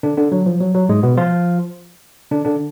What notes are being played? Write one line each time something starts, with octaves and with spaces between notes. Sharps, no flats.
D3 D4
D3 D4
F#3
F3
F#3
F#3
G#2 G#3
B2 B3
F3 F4
D3 D4
D3 D4